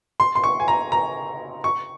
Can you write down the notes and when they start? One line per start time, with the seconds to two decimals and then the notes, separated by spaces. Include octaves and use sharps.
0.20 C6
0.35 C6
0.44 C#6
0.60 G#5
0.68 A#5
0.92 A#5
1.64 C#6